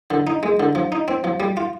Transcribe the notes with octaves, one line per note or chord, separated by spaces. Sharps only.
D3
D#4
G#3
D3
F3
D#4
C4
F3
G3
F4